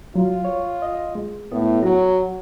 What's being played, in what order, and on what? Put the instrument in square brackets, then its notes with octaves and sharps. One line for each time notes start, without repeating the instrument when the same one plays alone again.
[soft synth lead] F#3 [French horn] F4
[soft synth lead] C#5
D#5
G#3
[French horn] A2 [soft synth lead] B3
[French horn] F#3 [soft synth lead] F#4